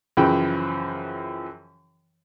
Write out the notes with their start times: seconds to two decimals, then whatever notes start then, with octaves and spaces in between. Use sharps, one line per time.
0.17 F#2 C#3 E3 F3 G5 B5